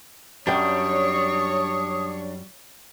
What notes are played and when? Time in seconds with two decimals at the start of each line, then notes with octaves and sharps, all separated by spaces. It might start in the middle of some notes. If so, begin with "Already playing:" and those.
0.47 F#2 G3 D4 C#5 G5 D#6